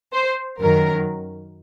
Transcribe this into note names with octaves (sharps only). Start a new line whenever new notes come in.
C5
F#2 D#3 F#3 A#4